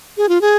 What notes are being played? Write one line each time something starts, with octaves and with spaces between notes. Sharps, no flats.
G#4
F4
G#4